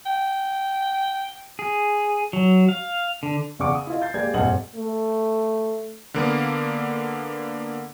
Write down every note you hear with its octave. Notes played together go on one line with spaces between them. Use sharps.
G5
G#4
F#3
F5
D3
E2 C#3 D5 F#5 C#6 D6
D#6
E4 F4 D#5
G6 A6 C7
G#3 A#3 G4 D5 G#6
F1 A#1 G2 D#5 F#5 F#7
A3
D3 A#3 B3